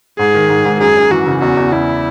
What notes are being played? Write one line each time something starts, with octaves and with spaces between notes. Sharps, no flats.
G#2 G#4
D#3
G#2
G#2
F#2 G#4
F#2
E3 F#4
C#3
E2 F#4
E2
E2 E4